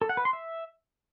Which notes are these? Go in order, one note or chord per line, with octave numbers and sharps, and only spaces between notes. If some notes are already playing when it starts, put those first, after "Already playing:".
A4
F#5
B4
C6
E5